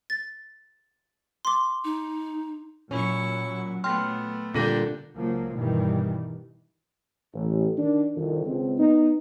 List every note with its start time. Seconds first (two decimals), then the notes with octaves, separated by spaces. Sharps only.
0.10 A6
1.45 C6 D6
1.84 D#4
2.91 A#2 F#3 C#4 E4 C#6
3.84 A3 B3 G5 C6 F6
4.54 A#2 D3 G3 C4 D4 A4 G5 A#6
5.15 C#2 F3 F#3 A#3
5.54 G2 B2 D#3 E3 G3
7.34 A1
7.77 D#3 D4
8.16 C2 F2 D#3
8.45 C#2 C4
8.79 B3 D#4